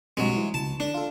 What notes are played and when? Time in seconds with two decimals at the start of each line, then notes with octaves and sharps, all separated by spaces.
0.17 B1 G2 C3 F#3 G#3
0.36 E3
0.54 C#2 A5
0.80 D3 D4
0.94 F4 A4